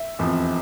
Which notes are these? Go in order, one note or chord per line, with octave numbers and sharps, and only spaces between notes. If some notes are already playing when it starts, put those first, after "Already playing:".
Already playing: E5
F1 E2 C3 F3